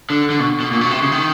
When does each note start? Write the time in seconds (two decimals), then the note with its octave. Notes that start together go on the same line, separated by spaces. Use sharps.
0.10 D3
0.30 D3
0.40 B2
0.60 B2
0.71 A#2
0.81 B2
0.91 C3
1.02 C#3
1.12 D#3